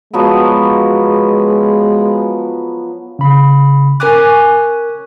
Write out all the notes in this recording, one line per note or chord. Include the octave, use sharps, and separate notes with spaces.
F3 F#3 G#3 B3
C#3 B5
C#4 A#4 G#5 D6 F#6